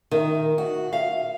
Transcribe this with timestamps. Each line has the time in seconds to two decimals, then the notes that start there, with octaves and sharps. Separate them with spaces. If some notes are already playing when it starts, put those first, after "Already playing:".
0.11 D#3
0.58 F#4
0.93 F5